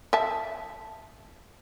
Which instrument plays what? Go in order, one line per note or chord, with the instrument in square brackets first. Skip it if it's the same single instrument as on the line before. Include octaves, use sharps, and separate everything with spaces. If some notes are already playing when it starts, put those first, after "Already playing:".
[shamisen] E5 A5